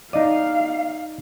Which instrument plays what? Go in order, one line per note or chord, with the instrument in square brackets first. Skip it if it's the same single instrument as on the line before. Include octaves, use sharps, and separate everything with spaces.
[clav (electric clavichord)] D#4 D5 [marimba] D#5 [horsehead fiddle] F5